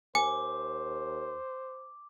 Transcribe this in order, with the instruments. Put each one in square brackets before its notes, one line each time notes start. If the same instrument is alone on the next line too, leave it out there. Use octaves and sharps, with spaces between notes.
[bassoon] D#2 [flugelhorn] C5 [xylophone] G#5 [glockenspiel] D6